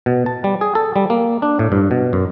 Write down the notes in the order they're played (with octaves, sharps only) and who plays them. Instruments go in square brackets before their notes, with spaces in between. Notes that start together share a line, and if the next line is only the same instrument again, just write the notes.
[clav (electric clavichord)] B2
A5
G3
G#4
A4
G3
A#3
D4
A2
G2
B2
F#2